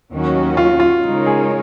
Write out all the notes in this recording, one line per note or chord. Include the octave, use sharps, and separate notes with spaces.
D#2 D#3 F#3 C#4 F#4
F4
F4
C#3 G#3 D#4 A#4 C#5
G#4